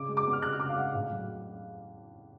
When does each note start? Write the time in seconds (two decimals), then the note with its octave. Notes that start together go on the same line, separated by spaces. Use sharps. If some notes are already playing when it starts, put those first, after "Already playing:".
Already playing: C#3 D6
0.08 G#3
0.17 D6
0.26 B3
0.33 F6
0.42 C#3 F#6
0.53 F6
0.60 C#3 D6
0.69 F5
0.77 G#3 F#5
0.94 A2 F5
1.11 F#3